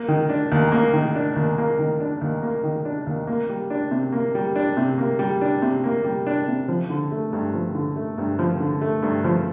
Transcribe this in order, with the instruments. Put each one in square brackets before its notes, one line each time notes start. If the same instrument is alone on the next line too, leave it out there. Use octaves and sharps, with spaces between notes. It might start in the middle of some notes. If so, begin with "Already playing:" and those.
Already playing: [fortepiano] A#3
D#3
D4
D#2
A#3
D#3
D4
D#2
A#3
D#3
D4
D#2
A#3
D#3
D4
D#2
A#3
G3
D4
C3
A#3
G3
D4
C3
A#3
G3
D4
C3
A#3
G3
D4
C3
F3
D3
A3
G2
F3
D3
A3
G2
F3
D3
A3
G2
F3